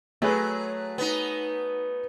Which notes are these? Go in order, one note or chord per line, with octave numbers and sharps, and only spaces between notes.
F#3 A3 G#4 B4
B3 D#4